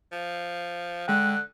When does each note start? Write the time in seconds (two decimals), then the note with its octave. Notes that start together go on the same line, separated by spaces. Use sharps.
0.12 F3
1.08 D3 G#3 G5 F#6